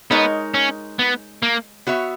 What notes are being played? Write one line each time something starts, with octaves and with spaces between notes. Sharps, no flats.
G#3 B3 D#4 A#4 C#5
C#4
B3
A#3
B3 F#4 C#5 E5